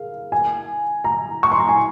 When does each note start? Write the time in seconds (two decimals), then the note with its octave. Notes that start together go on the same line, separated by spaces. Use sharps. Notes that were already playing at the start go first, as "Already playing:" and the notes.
Already playing: G#4 A#4 F5
0.32 G#5
1.04 A#5
1.43 C#6
1.52 C6
1.60 A#5
1.69 G#5